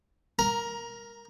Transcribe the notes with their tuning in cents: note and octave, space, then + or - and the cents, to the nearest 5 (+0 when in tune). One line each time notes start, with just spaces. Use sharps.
A#4 +0 A#5 +20